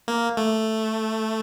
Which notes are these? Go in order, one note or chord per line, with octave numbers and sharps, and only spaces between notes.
A#3
A3